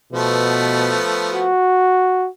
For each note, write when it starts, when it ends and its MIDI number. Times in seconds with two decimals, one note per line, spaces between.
0.12 0.99 47
0.12 1.50 53
0.12 1.50 57
0.12 1.50 59
1.33 2.28 66